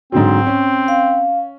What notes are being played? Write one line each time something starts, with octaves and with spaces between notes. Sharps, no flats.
G#2 D3 F#3 C4
C#4
F5